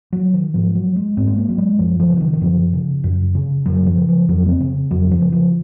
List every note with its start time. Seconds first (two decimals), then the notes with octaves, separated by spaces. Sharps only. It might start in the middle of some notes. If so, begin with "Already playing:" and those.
0.13 F#3
0.34 D#3
0.54 G#2 F3
0.75 F#3
0.96 G#3
1.17 G#2 C4
1.27 G#3
1.38 A#3
1.49 F#3
1.58 G#3
1.79 F#2 F3
2.00 F3
2.10 C#3
2.16 F3
2.21 D#3
2.33 D#3
2.41 F#2 F3
2.73 C#3
3.04 F#2
3.35 C#3
3.66 F#2 F#3
3.86 F3
3.97 C#3
4.08 F3
4.28 F2 F#3
4.45 A#3
4.49 C4
4.60 C#3
4.91 F2 F#3
5.11 F3
5.21 C#3
5.32 F3